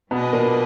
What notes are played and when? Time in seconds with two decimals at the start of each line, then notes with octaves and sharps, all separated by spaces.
0.11 B2 F#3 B3 D4 G#4 B4 D#5
0.33 A#2 A#3